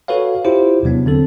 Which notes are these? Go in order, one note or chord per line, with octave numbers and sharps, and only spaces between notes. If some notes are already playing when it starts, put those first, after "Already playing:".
F#4 A4 B4 C#5 F5
E4 F4 G4 C5
E2 C3 F#3 B3 D4
D3 C4 A4